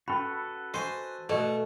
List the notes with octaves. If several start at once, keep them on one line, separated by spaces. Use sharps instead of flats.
C#4 F#4 A4 B4 B5
C5 D#5 G#5 C#6
B2 A3 D5